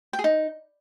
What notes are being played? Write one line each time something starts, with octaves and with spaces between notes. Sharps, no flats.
G5
G#4
D#4